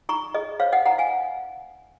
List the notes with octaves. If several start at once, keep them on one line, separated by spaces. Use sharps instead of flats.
D#4 A#5 C#6
G#4 D#5
C5 C#5 F5
D#5 F#5
D#4 F#5 A#5
F5 G#5